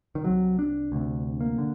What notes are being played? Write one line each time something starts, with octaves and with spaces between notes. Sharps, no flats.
D#3
C2 C3 F#3
D4
D2 C3
A#3
D3